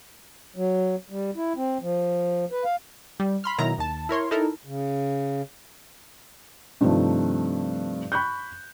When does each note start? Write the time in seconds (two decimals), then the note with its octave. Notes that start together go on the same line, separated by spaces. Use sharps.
0.56 F#3
1.10 G3
1.36 E4
1.56 C4
1.82 F3
2.52 B4
2.64 F5
3.20 G3
3.44 B5 C6 F6
3.58 B2 D#3 F#3 E4 A#5
3.78 D#2 A5
4.09 E4 A#4 C#5 C6
4.31 D#4 E4 A4 A#4
4.65 C#3
6.81 G2 C3 D#3 F3 A3
8.12 B5 C#6 F#6 G6